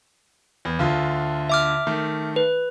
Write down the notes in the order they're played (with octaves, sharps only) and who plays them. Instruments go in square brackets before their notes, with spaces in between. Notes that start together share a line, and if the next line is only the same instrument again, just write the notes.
[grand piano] E2
D2 D3 F4
[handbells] E5 D6 F6
[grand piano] D#3 A3
[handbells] B4